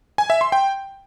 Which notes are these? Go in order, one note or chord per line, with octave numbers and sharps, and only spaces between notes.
G#5
E5
C6
G5